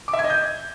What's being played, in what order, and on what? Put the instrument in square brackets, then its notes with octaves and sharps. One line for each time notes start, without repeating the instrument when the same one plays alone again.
[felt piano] D6
E5
G#6
D#5
G6